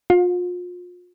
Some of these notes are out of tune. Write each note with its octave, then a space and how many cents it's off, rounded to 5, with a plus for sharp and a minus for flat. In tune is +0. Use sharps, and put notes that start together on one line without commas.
F4 +35